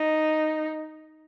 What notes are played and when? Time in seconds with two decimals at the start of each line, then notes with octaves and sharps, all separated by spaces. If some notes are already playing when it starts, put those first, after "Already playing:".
Already playing: D#4